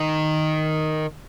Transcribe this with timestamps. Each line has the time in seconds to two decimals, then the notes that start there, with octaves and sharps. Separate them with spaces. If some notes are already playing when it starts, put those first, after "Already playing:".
Already playing: D#3